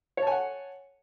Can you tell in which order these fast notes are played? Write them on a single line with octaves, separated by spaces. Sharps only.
C#5 A5 G#5 F#5